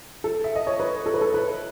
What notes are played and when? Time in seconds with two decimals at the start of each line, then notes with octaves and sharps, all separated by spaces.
0.24 A4
0.44 E5
0.56 D#5
0.67 C#5
0.80 B4
1.06 A4
1.14 B4
1.21 A4
1.34 B4